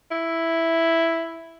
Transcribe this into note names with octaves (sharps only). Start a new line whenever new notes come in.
E4